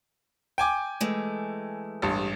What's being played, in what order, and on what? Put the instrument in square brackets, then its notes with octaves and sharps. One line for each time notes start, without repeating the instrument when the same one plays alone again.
[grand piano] G5 G#5 D6
[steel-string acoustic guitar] E3 G#3 A3
[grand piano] A1 G2